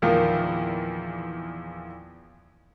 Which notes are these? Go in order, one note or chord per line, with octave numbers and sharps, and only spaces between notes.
E2 A#2 D#3 F3 A#3